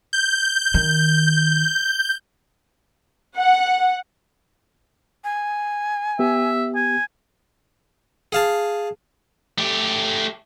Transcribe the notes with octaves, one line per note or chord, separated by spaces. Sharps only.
G6
D#3
F#5
G#5
B3 G4 E5
G#5
G#4 F5 A5
A3 G4